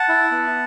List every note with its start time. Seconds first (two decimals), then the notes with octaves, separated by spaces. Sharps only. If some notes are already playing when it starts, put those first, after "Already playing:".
Already playing: F#5 A5
0.09 E4
0.31 B3